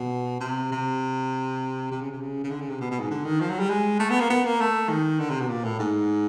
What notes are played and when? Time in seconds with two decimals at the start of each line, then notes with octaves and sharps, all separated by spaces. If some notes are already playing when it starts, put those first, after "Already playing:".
Already playing: B2
0.41 C3
0.72 C3
1.91 C3
2.01 C#3
2.11 C3
2.21 C#3
2.44 C#3
2.50 D3
2.60 C#3
2.70 C3
2.81 B2
2.91 B2
3.00 G#2
3.10 D3
3.25 D#3
3.40 F3
3.50 F#3
3.59 G3
3.70 G#3
3.99 A3
4.10 B3
4.20 A#3
4.30 B3
4.45 A#3
4.60 A3
4.89 D#3
5.19 D3
5.30 C3
5.40 B2
5.49 A#2
5.64 A2
5.79 G#2